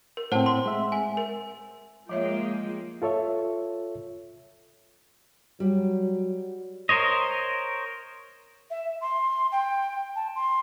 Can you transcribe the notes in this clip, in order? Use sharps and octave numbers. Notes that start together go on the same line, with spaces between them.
A#4
A2 C4 C5 F#5 A5
C6
G#3 E5
G#5
A#4
F3 G#3 A#3 F4 C#5 E5 G5
F4 A4 C#5 E5
F#3 G3
A#4 C5 C#5 D#5
E5
C6
G5
A5
C6